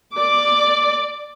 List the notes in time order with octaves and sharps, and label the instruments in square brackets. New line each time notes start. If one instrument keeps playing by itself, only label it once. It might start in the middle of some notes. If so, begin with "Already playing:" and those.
[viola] D5 D6